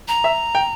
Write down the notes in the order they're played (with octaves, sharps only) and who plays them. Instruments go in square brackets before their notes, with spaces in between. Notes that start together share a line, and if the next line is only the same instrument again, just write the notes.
[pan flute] A#5
[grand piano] E5
G5